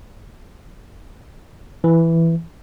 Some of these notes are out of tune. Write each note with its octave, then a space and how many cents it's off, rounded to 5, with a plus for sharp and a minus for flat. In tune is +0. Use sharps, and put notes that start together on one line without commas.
E3 +5